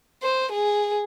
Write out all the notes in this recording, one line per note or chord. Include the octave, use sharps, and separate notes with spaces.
C5
G#4